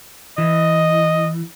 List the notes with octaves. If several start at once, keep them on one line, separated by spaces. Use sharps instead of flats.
E3 D#5